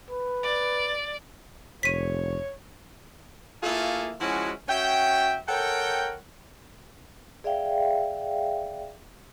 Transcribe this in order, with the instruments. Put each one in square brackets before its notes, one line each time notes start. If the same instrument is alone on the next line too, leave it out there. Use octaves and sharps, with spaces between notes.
[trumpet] B4
[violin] D5
[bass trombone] F1 [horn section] C#5 [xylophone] B6 D#7
[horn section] A3 A#3 E4 F4 G#4 A4
F3 G#3 C#4 E4 F#4
C#4 F#4 E5 G5
A4 A#4 C#5 F#5 G5
[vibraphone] G#4 D5 E5 F5 G5